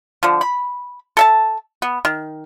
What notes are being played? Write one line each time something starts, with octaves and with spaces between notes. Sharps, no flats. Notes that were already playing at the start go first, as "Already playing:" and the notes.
D3 F3
B5
A4 E5 A5
B3
D#3